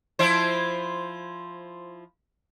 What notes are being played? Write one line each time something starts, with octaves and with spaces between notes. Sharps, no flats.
F3 E4 C5